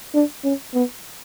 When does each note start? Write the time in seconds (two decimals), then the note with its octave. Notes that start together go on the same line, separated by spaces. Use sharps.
0.14 D4
0.44 C#4
0.74 B3